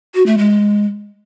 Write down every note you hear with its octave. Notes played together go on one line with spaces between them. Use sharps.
F#4
A3
G#3